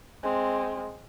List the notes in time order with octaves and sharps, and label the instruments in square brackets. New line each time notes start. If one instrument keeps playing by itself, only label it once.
[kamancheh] G#3 C4